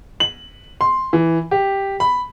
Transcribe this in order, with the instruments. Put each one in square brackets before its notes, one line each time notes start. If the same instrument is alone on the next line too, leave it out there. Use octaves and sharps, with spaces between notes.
[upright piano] F#7
C6
E3
G4
B5